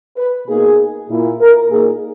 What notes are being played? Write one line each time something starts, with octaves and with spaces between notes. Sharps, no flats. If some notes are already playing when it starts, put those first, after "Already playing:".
B4
B2 A#3 D#4 G#4
A#2 A#3 E4
A#4
A#2 A#3 D#4 G#4